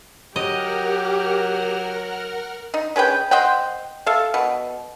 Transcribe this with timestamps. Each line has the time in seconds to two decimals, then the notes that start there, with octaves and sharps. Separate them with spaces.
0.36 F#3 G4 A#4 D#5 F#5 F6
2.74 D#4
2.96 C#4 G#4 B4 G5
3.31 C5 D#5 F#5 G5
4.06 A4 E5 F5
4.34 B2